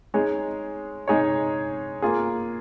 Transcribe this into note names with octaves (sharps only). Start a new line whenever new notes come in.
G#3 D#4 G#4 C#5
G#3 D#4 G#4 C#5
A#3 F4 G#4